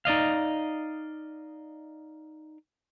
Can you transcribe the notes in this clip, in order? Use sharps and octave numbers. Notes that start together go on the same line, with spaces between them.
D#4 D5 D#5 F5